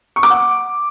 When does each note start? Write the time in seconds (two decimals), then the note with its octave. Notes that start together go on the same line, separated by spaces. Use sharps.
0.16 C#6
0.23 D6
0.30 F#5